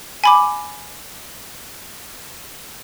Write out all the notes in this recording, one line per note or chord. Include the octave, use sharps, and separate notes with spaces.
G#5 B5 D6